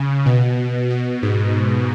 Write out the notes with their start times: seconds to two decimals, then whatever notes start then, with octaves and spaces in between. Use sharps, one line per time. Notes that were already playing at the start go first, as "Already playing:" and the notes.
Already playing: C#3
0.26 B2
0.90 B2
1.23 G#2